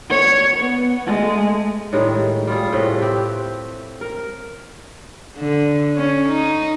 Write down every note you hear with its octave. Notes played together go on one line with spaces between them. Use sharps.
C#5
B3
G#3 A3
A2 D#3 G3 G#3
G3 F4 G#4
A2 C3 A3
C4 G4 B4
A#4
D3
C#4
D#4